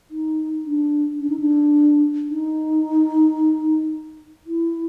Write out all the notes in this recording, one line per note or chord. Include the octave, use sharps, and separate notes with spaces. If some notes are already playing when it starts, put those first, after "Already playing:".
D#4
D4
D4
D#4
D4
D#4
E4